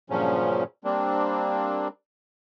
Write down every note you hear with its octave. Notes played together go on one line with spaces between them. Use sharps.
G2 A#2 C#3 F3 F#3 C#4
G3 A#3 C4 D4